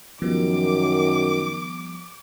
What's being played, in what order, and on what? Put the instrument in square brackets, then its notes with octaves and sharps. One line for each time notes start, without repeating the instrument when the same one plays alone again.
[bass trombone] F#2 [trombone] D#3 [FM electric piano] F3 G3 B3 [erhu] D6